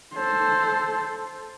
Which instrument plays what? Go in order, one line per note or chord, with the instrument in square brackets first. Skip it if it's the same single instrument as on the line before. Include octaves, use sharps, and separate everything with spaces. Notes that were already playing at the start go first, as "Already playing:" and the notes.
[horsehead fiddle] A4 C5